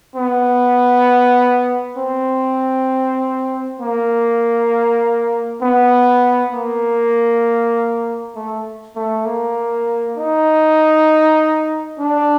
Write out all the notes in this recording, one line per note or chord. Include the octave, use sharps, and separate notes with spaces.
B3
C4
A#3
B3
A#3
A3
A3
A#3
D#4
D4